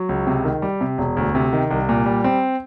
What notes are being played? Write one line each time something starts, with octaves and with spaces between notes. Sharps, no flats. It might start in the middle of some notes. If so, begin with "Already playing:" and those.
Already playing: F#3
C#2
C3
D#3
G3
C3
E1
D2
C3
D#3
C2
A#2
G3
C4